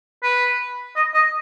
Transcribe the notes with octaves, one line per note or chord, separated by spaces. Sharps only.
B4
D#5
D#5